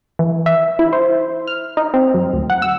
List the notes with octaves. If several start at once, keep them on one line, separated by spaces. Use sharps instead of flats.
E3
E5
E4
C5
F6
D#4
C4
F#2
D2
F#5
E6